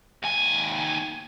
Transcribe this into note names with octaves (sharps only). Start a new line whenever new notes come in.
D#2 G#5